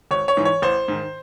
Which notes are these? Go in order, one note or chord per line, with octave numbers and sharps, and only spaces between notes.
G#1 C#5
C#5
G#2 E3
C#5
A1 C5
G#2 D#3